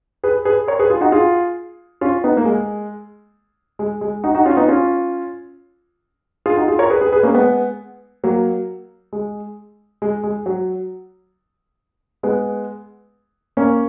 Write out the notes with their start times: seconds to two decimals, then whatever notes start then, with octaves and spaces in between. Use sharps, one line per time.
0.24 G#4 B4
0.45 G#4 B4
0.67 A#4 C#5
0.79 G#4 B4
0.90 F4 G#4
1.01 D#4 F#4
1.12 F4 G#4
2.01 C#4 F4
2.24 B3 D#4
2.37 A#3
2.45 G#3
3.79 G#3
4.01 G#3
4.24 D#4 F#4
4.35 D#4 F#4
4.46 C#4 F4
4.57 B3 D#4
4.68 C#4 F4
6.46 F4 G#4
6.57 D#4 F#4
6.68 F4 G#4
6.79 A#4 C#5
6.90 G#4 B4
7.01 G#4 B4
7.12 G#4 B4
7.23 A#3 C#4
7.34 G#3 B3
8.24 F#3 A#3
9.13 G#3
10.02 G#3
10.23 G#3
10.46 F#3
12.23 G#3 B3
13.57 A#3 C#4